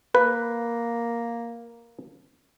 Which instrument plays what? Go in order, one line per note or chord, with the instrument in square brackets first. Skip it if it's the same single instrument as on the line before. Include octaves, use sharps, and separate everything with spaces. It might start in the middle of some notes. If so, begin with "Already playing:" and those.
[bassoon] A#3 [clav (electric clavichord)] B4